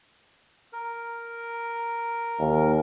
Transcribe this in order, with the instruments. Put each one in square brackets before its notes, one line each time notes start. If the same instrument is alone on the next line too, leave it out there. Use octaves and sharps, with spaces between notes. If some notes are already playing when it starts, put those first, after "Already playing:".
[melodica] A#4
[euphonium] D#2